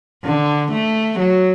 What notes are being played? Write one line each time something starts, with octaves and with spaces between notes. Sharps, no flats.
D3
A3
F#3